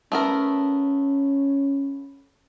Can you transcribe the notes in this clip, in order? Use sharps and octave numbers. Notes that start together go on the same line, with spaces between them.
A3 B3 C#4 A#4